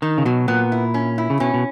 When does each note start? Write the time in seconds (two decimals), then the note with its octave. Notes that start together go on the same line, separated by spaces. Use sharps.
0.02 D#3 D#4
0.18 C#3
0.25 B2 F#3
0.48 A#2 B3
0.72 E4
0.94 C#4
1.18 E4
1.30 C#3
1.40 B2 C#4
1.54 B2